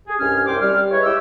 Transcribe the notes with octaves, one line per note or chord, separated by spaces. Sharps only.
G#4
C2 G2 C#4 G#5 F6
C2 F#2 C5 G5 C6 D6
G3 F6
G#3 E4 B4 C#5
E4 G4 E6